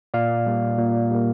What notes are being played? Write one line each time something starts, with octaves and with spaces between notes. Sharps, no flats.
A#2 D5 F5
G3 A#3
A#2
G3 A#3